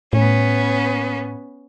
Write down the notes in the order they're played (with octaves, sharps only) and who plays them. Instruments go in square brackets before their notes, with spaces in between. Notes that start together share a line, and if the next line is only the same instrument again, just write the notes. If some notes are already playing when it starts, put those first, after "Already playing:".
[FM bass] A2 [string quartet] B3 C#4